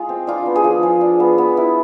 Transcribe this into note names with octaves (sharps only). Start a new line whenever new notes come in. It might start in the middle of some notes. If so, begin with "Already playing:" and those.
Already playing: G#3 F4 G#4
C4
D4 F4
B3
G#4
F3
F3
D4
B3
B3
E4